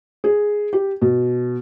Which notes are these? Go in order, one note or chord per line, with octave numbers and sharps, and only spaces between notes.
G#4
G4
B2